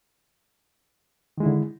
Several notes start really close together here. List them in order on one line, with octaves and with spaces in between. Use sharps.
D#3 G#3 E4 D3